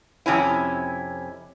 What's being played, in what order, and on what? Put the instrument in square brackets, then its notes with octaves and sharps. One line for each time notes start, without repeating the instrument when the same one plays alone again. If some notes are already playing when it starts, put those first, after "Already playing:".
[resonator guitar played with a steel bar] F2 C3 C#4 E4